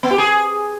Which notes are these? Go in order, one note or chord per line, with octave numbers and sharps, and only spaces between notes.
B3
G4
G#4